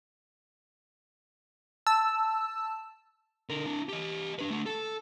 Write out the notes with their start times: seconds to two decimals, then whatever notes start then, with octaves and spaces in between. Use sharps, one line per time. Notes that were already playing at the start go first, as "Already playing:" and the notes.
1.87 A5 E6
3.49 D3 A#4
3.66 D4 E4
3.89 G4 D#5
4.39 D4 B4
4.50 A3 D4
4.66 A4